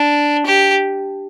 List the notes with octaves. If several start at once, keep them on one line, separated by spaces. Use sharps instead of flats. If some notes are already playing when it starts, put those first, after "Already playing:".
Already playing: D4
G4